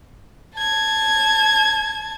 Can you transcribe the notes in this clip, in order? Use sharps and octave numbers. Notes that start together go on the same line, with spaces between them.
A5 G#6